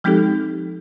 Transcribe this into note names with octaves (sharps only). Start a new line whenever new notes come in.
F3 G#3 C4 D#4 G4 A4